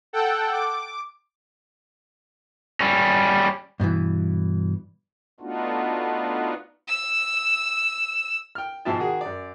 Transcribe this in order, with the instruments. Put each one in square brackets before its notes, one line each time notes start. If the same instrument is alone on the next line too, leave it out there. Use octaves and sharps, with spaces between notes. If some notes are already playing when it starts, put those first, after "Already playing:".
[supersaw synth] A4 F#5 G5
D6
[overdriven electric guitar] G3 C#4
[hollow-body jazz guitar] G2 B2 D#3 E3
[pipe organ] A3 B3 D4 D#4 F4 F#4
[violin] E6 E7
[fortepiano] G5 F6
G#2 B2 F3 E5 G5 A5
D#3 F#4 G#4
F#2 D5